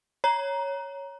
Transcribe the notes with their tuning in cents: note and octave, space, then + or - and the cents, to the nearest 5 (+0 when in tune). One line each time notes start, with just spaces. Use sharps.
C#5 +0 A#5 +15